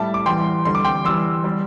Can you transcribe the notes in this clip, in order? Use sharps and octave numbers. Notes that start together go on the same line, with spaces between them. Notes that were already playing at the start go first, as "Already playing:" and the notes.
Already playing: A2 G3 E5 A5
D6
E2 E3 G3 G5 C6
E2 D3 G3 C6
D6
G5 C6
E2 E3 G3 C6 E6
G3